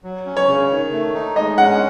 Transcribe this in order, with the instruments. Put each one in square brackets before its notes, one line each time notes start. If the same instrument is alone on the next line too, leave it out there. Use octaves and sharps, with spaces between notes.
[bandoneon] F#3
C#4
[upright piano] C#5
[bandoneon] C#3
D#3
A3
D#4
[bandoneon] G#3 [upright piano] D#5
[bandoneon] C#4 [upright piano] F#5